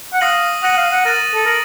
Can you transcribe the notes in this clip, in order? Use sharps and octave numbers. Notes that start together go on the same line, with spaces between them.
F#5
F5 D#6 A#6 D#7 F#7
F#5 D#6 A#6 D#7 F#7
F5
F#5
A#4 A6 D#7 F#7
A4
A#4 F#7